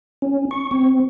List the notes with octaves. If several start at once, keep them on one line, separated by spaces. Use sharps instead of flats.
C#4
C#6
C4